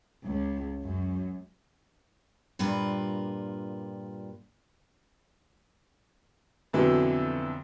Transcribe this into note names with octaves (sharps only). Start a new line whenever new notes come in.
C#2
F#2
G2 A#2 F4 A#4 B4
F2 B2 D3 E3 F#3